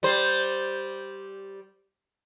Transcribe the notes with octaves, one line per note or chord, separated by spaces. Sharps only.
G3 C5